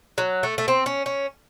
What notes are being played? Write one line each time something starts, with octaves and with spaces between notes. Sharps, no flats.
F#3
A3
A3
C4
C#4
C#4